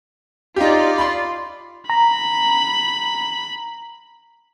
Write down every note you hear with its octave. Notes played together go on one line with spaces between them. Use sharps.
D#4 F4 G4 D5
B5 C6
A#5 B5